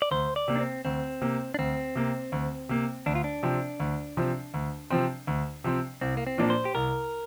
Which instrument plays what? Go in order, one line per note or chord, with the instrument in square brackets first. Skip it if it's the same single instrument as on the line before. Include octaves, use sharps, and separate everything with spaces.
[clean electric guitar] D5
[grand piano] D2 [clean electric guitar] C5
[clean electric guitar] D5
[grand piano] C3 A#3
[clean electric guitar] D4
C4
[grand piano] D2 [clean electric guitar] C4
[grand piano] C3 A#3
[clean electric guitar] D4
[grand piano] D2 [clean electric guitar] C4
[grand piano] C3 A#3
D2
C3 A#3
[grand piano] D2 [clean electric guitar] D4
[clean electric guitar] F4
D4
[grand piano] C3 F3 C4
D2
C3 F3 C4
D2
C3 F3 C4
D2
C3 F3 C4
[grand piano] C2 [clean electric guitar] C4
[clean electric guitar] A#3
C4
[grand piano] A#2 F3 A#3 D4
[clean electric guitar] C5
G4
[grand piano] C2 [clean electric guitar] A#4